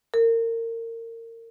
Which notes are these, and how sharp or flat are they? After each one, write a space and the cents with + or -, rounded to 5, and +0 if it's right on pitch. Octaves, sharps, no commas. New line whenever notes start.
A#4 -30